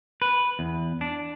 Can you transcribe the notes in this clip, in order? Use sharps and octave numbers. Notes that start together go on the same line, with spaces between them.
B4
E2
D4